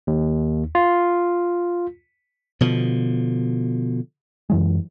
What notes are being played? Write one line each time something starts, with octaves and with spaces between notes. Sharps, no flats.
D#2
F4
B2 D3 F3
F#2 E3 G#3